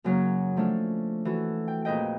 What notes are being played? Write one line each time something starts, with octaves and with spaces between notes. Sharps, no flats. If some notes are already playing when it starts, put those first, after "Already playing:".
F#2 C#3 F#3 A#3 C#4 C#5
F3 A3 C#4 D4 F4
E3 F#4 A4
G5
F2 A#2 G#4 B4 D#5 G5